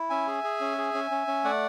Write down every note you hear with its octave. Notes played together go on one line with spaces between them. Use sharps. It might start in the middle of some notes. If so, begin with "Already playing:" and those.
Already playing: E4
C#4 E5 G#5
G#4
G#4
C#4
G#4
C#4
C#4
C#4
A3 D5 F#5